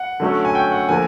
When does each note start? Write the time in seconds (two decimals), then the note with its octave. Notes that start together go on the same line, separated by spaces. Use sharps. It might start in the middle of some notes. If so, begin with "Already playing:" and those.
Already playing: F#5
0.20 D3 F#3 A3 C#4
0.45 G#5
0.55 G5
0.72 F#5
0.89 D3 F3 A#3 G#5